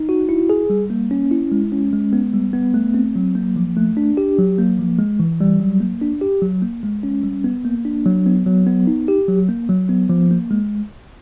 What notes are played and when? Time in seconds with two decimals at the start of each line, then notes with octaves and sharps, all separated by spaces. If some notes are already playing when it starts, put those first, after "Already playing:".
Already playing: D#4
0.09 F#4
0.29 E4
0.50 G#4
0.70 G3
0.90 A#3
1.11 C#4
1.31 E4
1.52 G#3
1.72 C#4
1.93 G#3
2.13 B3
2.34 G3
2.53 B3
2.74 A3
2.94 C4
3.16 F#3
3.35 A#3
3.56 F3
3.77 A3
3.97 D4
4.17 G4
4.38 F#3
4.58 A#3
4.79 F3
4.99 G#3
5.20 E3
5.41 G3
5.60 F#3
5.80 A#3
6.01 D4
6.21 G4
6.42 F#3
6.62 A#3
6.83 G#3
7.03 C#4
7.23 G3
7.44 B3
7.65 A#3
7.85 D4
8.06 F#3
8.26 B3
8.46 F#3
8.67 B3
8.87 D#4
9.08 G4
9.28 F#3
9.49 A#3
9.69 F#3
9.89 B3
10.10 F3
10.31 A#3
10.51 G#3